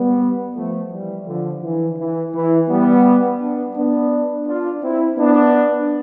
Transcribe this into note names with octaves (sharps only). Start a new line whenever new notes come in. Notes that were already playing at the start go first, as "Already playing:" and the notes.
Already playing: G3 B3
F3 A3
E3 G3
D3 F3
E3
E3
E3
G3 B3
B3 D4
B3 D4
D4 F4
C4 E4
B3 D4